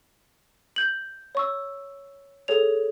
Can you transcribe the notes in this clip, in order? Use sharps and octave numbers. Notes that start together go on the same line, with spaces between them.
G6 F#7
C#5 C#6 E6
G#4 A4 C#5 F7